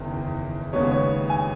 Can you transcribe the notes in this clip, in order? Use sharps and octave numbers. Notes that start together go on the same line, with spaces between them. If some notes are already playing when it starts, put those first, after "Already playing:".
Already playing: F#1 E2 D#3
D#2 C#3 G#3 B3 C#5
C#5
G#5